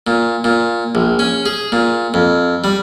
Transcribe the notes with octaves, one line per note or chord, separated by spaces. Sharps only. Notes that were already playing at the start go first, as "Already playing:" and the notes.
A#2
A#2
A#1
C#4
G#4
A#2
F2
G3